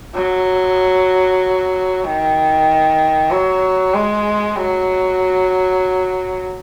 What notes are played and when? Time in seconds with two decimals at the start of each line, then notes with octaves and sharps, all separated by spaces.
0.15 F#3
2.05 D#3
3.31 F#3
3.94 G#3
4.56 F#3